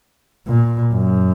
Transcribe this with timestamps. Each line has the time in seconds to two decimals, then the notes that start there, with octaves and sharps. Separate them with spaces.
0.47 A#2
0.94 F#2